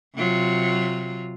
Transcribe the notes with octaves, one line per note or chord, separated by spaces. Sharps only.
C3 F#3 F4